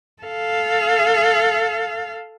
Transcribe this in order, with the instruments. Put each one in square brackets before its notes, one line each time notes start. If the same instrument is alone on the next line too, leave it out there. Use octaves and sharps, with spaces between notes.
[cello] A4 F5